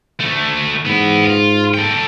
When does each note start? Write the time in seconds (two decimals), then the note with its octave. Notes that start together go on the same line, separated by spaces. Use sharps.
0.20 D2 A3
0.85 G#2 B3 E4
1.25 F4
1.74 A4 G5